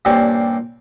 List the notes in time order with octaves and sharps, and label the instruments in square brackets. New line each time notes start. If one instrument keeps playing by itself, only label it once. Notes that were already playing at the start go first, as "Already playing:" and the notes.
[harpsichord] G2 A#2 G3 C4 C#4